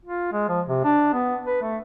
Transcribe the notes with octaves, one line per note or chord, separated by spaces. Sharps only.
F4
G#3
F3
C3
D4
B3
B4
A3